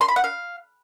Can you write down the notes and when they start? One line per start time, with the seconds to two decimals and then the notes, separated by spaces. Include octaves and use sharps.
0.01 C6
0.08 B5
0.16 F#5
0.24 F5